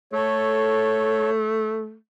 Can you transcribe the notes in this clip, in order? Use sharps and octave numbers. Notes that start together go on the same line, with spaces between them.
A3 A4 C#5